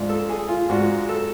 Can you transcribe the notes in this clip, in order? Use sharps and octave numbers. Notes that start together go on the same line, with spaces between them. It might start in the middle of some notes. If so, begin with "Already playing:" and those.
Already playing: G#2 G#3 D4 F4
A4
G#4
F4
G#2 G#3 D4 F4 F#4
A4